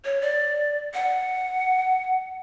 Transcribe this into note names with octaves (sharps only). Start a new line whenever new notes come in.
C#5
D5
F#5